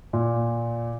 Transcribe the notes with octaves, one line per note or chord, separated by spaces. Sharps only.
A#2